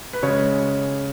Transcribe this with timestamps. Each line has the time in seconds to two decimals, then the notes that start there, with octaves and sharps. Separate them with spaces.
0.13 B4
0.23 C#3 G#3 C#5